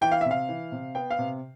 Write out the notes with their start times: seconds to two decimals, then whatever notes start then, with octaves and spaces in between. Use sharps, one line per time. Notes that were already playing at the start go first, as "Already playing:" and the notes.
0.01 E3 G5
0.12 F5
0.21 C3 E5
0.31 F5
0.49 E3
0.72 C3
0.95 B3 G5
1.10 F5
1.19 C3